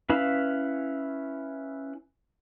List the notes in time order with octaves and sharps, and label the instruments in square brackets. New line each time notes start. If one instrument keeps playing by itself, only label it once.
[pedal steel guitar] C#4 E4 B4 F5 B5